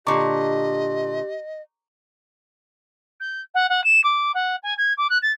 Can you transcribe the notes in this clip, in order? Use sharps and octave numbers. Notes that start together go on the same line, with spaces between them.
A#2 D3 G4 D#5 A#5 C#6 D6
G6
F#5
F#5
E7
D6
F#5
G#5
G#6
D6
F#6
A6